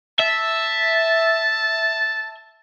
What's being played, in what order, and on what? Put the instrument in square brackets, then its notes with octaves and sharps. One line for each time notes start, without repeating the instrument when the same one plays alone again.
[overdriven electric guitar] E5 [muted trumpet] A5